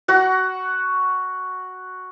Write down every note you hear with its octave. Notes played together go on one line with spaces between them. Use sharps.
F#4 F#5